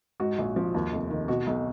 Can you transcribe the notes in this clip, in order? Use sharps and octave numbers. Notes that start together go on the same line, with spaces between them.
G#2 F#4
A#1
F3
D#2
F1
D#3
B2 F#4
B1